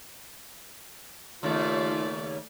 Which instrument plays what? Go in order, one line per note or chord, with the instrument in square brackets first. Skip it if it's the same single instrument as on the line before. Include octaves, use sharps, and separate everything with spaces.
[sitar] D#2 C#3 [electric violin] A3 D5 [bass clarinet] F4